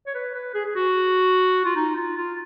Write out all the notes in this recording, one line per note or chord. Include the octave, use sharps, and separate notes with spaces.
C#5
B4
B4
G#4
G#4
F#4
F4
D#4
F4
F4